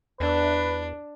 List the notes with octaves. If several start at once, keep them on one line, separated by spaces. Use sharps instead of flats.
E2 D4 B4